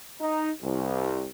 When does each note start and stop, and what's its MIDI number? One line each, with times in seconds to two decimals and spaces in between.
0.20 0.49 63
0.62 1.26 36